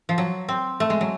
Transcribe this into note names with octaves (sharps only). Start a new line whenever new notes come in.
F3
F#3
C4
A3
G#3
F#3